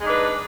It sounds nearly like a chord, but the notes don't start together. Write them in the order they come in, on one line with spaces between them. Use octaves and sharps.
G#3 D#4 D4 B4